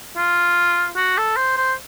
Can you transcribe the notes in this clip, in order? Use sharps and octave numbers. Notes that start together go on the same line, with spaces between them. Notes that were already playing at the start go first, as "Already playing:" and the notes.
F4
F#4
A4
C5
C5